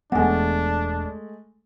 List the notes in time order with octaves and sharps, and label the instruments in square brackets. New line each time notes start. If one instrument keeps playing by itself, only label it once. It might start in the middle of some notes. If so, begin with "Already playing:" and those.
[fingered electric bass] E1 B3 [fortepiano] G#3 A3 [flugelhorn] D4 [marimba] F#5 G#5